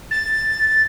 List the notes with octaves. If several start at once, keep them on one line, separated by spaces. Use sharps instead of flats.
A6